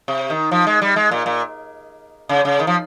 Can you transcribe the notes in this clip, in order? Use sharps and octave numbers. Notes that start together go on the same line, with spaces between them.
C3
D#3
F3
G#3
G3
G#3
A#2
A#2
C#3
C#3
D#3
F3